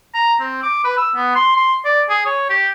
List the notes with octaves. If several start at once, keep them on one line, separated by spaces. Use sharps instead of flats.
A#5
C4
D6
B4
E6
B3
C6
C6
D5
G#4
C#5
G4